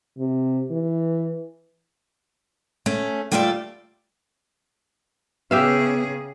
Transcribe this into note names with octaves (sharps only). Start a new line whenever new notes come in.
C3
E3
A3 C#4
G3 A3 E4 F4 A4 D5
C#3 B3 G4 G#4 E5 F5